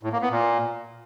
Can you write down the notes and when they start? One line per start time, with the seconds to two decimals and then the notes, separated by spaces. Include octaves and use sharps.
0.03 A2
0.12 A#3
0.22 B3
0.31 A#2